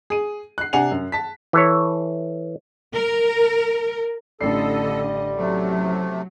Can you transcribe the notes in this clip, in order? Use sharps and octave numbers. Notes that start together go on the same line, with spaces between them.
G#4 D#7
F#6 C7
C3 D4 F#5 G#5 F7
F#2
A5 B6
E3 A4 C#5
A#4
A1 D3 G3 A4 D#5 C7
C3 F#3 A3